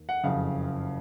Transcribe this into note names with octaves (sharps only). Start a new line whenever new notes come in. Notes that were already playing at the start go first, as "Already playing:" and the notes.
Already playing: D#2
F#5
F#1 F2 C#3 F5